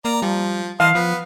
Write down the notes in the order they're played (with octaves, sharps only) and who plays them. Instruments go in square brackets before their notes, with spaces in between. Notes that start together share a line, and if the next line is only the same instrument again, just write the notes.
[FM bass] A#3 [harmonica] D5 A#5
[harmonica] F3 [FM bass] G3
[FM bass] E3 [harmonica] D#5 A5 C6 [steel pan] F5
[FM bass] F3 [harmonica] B3